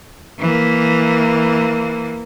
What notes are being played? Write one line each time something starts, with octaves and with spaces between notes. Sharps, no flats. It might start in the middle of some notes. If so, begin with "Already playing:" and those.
E3 A#3